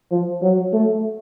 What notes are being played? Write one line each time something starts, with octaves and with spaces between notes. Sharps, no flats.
F3
F#3
A3